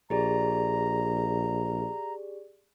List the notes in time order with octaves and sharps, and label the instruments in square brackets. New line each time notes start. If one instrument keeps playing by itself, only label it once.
[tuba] A#1 [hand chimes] G4 G#4 D5 [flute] A#5